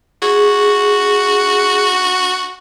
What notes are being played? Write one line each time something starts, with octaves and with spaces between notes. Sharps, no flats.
F#4 G#4